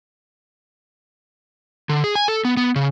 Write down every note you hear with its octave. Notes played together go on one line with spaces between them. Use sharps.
D3
G#4
G#5
A4
B3
B3
C#3